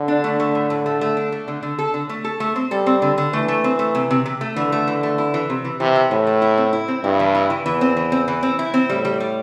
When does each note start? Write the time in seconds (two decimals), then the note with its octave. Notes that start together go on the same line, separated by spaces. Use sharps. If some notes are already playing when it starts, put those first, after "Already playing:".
Already playing: D3
0.08 D4
0.24 A3
0.40 A3
0.55 A2
0.70 A2
0.86 A3
1.01 A3
1.17 D4
1.32 A3
1.48 D3
1.63 D3
1.79 A4
1.94 D3
2.09 A3
2.24 A4
2.40 A3
2.56 C4
2.71 G3 A4
2.86 C4
3.02 D3
3.18 D3
3.33 E3 A3
3.48 A3
3.64 C4
3.79 A3
3.95 C3
4.11 C3
4.26 C3
4.41 A3
4.56 D3 E3
4.72 A3
4.87 E3
5.03 A3
5.18 E4
5.34 E3
5.50 C3
5.65 E3
5.80 C3 E3
5.96 E3
6.11 A2 E3
6.27 A3
6.42 E4
6.57 C4
6.73 E4
6.88 C4
7.03 G2 E4
7.20 E3
7.35 E4
7.50 E3
7.65 E2 E3
7.81 C4
7.97 E3
8.12 C4
8.28 E3
8.43 C4
8.59 E4
8.74 C4
8.90 A2 G3
9.05 G3
9.20 G3